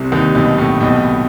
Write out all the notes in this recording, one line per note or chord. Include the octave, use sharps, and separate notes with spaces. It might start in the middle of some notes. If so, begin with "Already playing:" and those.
Already playing: C2 C3
D#2 D#3
B1 B2
A2
B1 B2